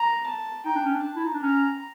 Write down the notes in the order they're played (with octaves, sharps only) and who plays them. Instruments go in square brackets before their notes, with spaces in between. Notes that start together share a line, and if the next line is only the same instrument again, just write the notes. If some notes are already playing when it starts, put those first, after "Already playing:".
Already playing: [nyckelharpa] A#5
A5
[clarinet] D#4 [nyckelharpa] G5
[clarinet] D4
C#4
D4
[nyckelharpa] A5
[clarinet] E4
D#4
D4
[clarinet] C#4 [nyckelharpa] A#5